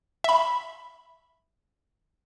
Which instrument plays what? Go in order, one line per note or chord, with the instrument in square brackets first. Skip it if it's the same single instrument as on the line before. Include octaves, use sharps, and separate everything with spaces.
[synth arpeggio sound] E5 B5